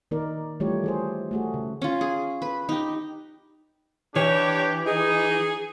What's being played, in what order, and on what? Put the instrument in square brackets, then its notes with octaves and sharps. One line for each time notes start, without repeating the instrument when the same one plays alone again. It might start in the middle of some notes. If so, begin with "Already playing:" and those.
[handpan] D#3 A#3 D#4 A#4 D5
E3 G3 A3 F4 G4 C#5
E3 G#4 C5
A3 F#4 G#4
C#3
[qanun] C#4 F4
G#4
B4
D#4 G4
[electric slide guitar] E3 [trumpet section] D4 G4 [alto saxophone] C#5
[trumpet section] D#4 [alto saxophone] G#4